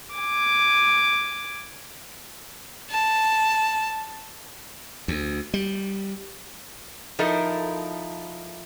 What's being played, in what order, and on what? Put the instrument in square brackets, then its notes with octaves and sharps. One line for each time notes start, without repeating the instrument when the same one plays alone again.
[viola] G#5 D6
[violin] A5
[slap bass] D2
G3
[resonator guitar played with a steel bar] F3 D#4 E4 A4 A#4